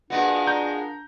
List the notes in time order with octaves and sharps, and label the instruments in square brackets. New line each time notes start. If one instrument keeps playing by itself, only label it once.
[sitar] A#2 G#3 B3 [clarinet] D4 [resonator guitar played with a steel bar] F#4 B4
[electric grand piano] A#5 G6